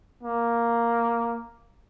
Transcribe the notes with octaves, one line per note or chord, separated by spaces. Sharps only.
A#3